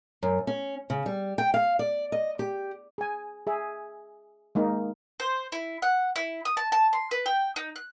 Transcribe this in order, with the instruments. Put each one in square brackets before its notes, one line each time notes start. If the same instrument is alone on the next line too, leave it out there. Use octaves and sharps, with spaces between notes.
[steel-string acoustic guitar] F#2
C#4
C#3
G3
G5
F5
D5
D#5
G4
[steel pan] G#4 G#5
G#4 E5
G#3 A#3 D#4
[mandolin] C5
E4
F#5
E4
D#6
A5
A5
C6
B4
G5
D#4
F#6